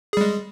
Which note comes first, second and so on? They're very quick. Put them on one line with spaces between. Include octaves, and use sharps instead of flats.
G#4 G3 G#3